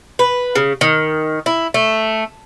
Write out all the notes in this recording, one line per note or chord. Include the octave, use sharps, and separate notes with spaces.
B4
C#3
D#3
E4
A3